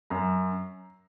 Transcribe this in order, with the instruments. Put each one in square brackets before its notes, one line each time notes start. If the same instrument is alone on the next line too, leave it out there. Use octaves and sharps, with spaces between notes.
[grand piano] F#2 A#5